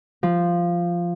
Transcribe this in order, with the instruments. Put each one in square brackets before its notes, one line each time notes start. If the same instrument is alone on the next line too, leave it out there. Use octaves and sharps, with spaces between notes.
[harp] F3